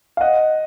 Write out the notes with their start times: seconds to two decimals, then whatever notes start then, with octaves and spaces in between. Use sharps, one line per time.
0.17 F5
0.21 D#5 F#5